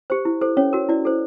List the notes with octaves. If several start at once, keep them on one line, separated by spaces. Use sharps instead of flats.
G4 C5
E4
A4 C5
C#4 C#5
F#4 A#4
E4 D5
A4 C5